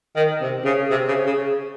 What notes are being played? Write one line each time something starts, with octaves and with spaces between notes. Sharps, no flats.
D#3
C3
C#3
C3
C#3
C#3